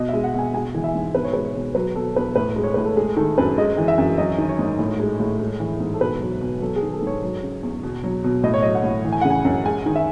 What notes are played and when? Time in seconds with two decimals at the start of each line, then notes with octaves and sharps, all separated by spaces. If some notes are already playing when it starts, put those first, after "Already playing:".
Already playing: B2 D#5
0.09 G#3 E5
0.24 F#5
0.34 B2 G#5
0.54 G#3 G#5
0.74 E3
0.84 E5
0.95 G#2
1.15 B2 B4
1.24 C#5
1.33 G#3 B4
1.45 C#5
1.56 B2
1.75 F#3 B4
1.95 B2 A4
2.16 E2 B4
2.35 A2 B4
2.56 G#3
2.63 C#5
2.74 A2 B4
2.85 A4
2.97 G#3 G#4
3.17 D#3 A4
3.38 F#2 B4
3.58 G#3 D#5
3.78 E3
3.88 E5
3.98 F#2
4.18 F#3 D#5
4.38 D#3
4.49 C#5
4.59 G#2
4.79 A2
5.00 G#3
5.20 A2
5.40 G#3
5.60 E3
5.80 G#2
5.94 A4
6.00 B2 B4
6.21 F#3
6.41 B2
6.61 F#3 A4
6.76 G#4
6.82 D#3
6.92 A4
7.02 G#2 C#5
7.22 F#3
7.43 C#3
7.63 E2
7.83 B2
8.04 F#3
8.24 B2
8.43 A2 D#5
8.54 C#5
8.63 F#3 D#5
8.75 F#5
8.84 A2
9.05 E3
9.12 G#5
9.21 C#3 F#5
9.30 G#5
9.45 F#2
9.65 G#3 G#5
9.86 D#3
9.96 E5